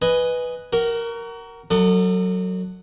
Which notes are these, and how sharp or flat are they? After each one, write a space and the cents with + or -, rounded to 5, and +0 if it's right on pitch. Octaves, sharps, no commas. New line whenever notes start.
B4 +0 D#5 +0 G#5 +0
F#4 +30 A#4 -5
F#3 +0 A4 +35 D#5 -35